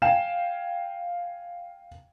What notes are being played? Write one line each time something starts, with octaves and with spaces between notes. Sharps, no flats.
F5 G5 G#5 E7